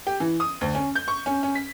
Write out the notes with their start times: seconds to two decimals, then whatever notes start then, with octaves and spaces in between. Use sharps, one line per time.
0.07 G4
0.20 E3
0.40 D#6
0.61 D2
0.75 C#4
0.95 G6
1.08 C#6
1.26 C#4
1.43 C#4
1.55 B6